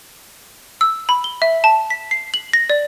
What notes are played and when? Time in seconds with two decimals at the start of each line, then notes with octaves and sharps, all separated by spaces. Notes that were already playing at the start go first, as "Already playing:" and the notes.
0.81 E6
1.09 B5
1.24 G7
1.42 E5
1.64 A5
1.90 B6
2.11 C7
2.34 F#7
2.53 A#6
2.70 D5